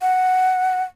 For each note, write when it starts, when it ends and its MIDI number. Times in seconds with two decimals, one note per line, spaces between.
0.02 0.83 78